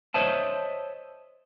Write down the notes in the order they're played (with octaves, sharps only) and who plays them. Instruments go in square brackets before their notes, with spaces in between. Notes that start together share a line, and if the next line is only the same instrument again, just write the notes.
[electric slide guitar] C5 C#5 D#5 E5 A5